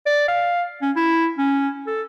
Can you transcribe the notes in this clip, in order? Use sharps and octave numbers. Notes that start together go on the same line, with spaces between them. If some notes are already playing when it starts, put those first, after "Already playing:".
D5
F5
C#4
E4
C#4
A4